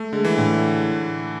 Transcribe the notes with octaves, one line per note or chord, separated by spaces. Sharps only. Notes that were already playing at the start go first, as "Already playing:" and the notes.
Already playing: A3
D3 G#3
E3
A2 D3